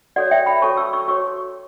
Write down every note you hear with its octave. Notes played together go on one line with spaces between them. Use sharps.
F#4 A4 C#5 D5 F#5
E5 G5
G5 B5
F#4 A4 C#5 A5 C#6
C#6 E6
C#6 E6
F#4 A4 C#5 C#6 E6